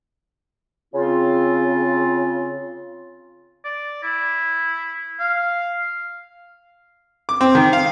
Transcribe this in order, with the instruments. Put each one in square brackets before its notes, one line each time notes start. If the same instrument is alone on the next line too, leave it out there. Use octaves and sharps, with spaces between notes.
[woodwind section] C#3 C4 F4
[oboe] D5
E4
F5
[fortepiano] D6
C4
D#3
F5